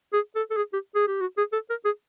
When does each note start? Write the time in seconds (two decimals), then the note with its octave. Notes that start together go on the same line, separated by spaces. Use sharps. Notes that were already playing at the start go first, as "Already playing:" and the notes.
0.13 G#4
0.36 A4
0.51 A4
0.57 G#4
0.73 G4
0.95 G#4
1.07 G4
1.20 F#4
1.38 G#4
1.53 A4
1.70 A#4
1.85 G#4